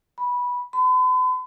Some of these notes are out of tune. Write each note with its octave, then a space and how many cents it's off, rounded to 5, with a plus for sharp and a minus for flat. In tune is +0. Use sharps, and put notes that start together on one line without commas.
B5 -10
B5 +45